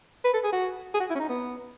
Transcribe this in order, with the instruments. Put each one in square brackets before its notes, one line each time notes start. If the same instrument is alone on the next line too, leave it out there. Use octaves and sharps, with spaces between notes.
[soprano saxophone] B4
A4
G#4
F#4
G#4
F#4
E4
C#4
D#4
B3